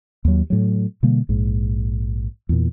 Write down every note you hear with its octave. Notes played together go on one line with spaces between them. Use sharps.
D#2 F#3
A2 F#3
B2 D3 G3 A#3
A#1 G#2
E2 A#2